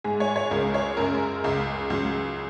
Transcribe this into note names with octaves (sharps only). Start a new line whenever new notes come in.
G#2 G#3 G#4
C#5
C#5
C#2 C#3 G#3 A#4
C#5
F#2 C#3 G#3 A#4
C#2 C#3 G#3
C#2 C#3 F#3